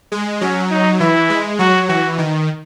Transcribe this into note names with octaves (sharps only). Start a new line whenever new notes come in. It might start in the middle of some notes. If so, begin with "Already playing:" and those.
G#3
F#3 C#4
D#4
E3 E4
G#3
F#3 F#4
E3 F#4
D#3